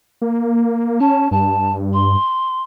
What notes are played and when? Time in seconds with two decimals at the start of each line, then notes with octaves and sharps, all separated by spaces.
0.22 A#3
1.00 C#4 A5
1.31 G2 A5
1.93 C6